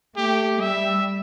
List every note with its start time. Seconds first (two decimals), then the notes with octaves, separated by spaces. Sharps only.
0.16 A3 G4
0.60 G3 E5